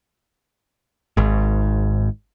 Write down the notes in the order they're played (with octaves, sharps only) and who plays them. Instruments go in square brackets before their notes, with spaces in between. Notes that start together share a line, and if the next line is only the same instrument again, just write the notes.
[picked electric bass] G#1 G#2